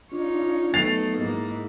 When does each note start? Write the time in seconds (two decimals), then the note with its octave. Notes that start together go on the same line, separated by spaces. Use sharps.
0.12 D4 D#4 F4 C#5
0.74 F#3 A3 B3 D#4 A6 C7 F7
1.17 G#2 A#3 E4